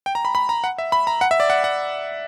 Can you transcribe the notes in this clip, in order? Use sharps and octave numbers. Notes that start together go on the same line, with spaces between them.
G5
A#5
B5
B5
A#5
F#5
E5
B5
A#5
F#5
E5
D5
F#5
F#5